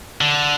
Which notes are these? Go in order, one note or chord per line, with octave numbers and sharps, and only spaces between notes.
D3